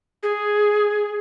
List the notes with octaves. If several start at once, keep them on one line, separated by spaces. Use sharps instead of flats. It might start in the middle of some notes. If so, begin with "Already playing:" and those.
G#4